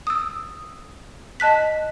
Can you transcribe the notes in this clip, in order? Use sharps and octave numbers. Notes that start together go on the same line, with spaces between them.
D#6 E6
D#5 A5 F#6 B6